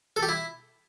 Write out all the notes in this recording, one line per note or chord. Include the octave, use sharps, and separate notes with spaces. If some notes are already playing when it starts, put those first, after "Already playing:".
A4
G4
E4